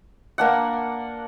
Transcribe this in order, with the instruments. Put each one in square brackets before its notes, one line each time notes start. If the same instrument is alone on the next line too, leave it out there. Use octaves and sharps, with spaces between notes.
[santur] A#3 D4 F#5